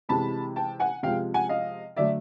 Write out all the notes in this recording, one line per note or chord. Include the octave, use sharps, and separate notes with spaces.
C3 E3 G#3 A5 B5
G5 A5
F#5 G#5
C3 F3 G#3 F5 G5
F#5 G#5
D#5 F5
D3 F#3 A3 D5 E5